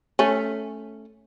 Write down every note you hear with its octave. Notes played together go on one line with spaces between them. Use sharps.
A3 C#4